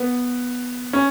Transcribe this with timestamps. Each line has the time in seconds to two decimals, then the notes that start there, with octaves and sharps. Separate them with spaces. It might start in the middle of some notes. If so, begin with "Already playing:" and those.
Already playing: B3
0.93 C#4